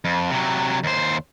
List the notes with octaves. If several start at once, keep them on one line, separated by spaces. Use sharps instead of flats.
F2
C3 F#3
D#2 C5